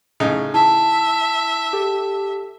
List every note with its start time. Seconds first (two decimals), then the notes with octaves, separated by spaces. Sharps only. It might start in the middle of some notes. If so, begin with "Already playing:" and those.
0.20 A2 C#3 D#4
0.54 E4 E5 A5
1.73 G4 A4